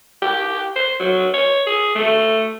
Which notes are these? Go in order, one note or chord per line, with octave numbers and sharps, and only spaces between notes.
G4
C5
F#3
C#5
G#4
A3